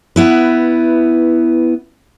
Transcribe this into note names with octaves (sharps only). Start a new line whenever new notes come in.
B3 E4 B4